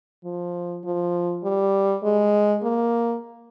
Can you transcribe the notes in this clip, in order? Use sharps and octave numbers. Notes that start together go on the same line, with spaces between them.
F3
F3
G3
G#3
A#3